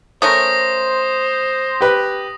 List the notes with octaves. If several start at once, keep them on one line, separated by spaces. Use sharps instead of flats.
A3 C#4 A#4 C5 D#6 A#6
G4 B4